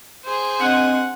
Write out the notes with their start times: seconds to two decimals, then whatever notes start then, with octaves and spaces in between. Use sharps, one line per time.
0.25 G#4 C5
0.60 C4 D4 D#5 F#5 G#5